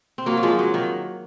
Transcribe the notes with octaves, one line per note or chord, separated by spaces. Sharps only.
C4
F#3 A#3
F#3
F3 G#3
F#3
D#3